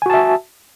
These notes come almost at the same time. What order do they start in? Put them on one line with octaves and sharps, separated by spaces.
G#5 F#4 A5 E5